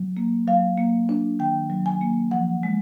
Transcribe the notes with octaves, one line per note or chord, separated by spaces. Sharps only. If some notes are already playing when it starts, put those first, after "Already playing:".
Already playing: F#3
A#3
F#3 F5
A#3
D4
D#3 G5
F#3
G#5
A#3
F3 F#5
G#3